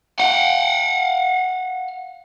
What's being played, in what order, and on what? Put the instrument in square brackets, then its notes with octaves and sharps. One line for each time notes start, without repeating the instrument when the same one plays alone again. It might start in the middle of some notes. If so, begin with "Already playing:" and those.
[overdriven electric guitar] F5 F#5